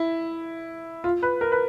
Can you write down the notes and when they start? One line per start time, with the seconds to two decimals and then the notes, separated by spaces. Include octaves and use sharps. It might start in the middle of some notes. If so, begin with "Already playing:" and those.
Already playing: E4
1.04 F4
1.23 B4
1.41 A#4
1.52 B4